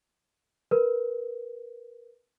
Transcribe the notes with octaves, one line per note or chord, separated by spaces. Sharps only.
A#4 B4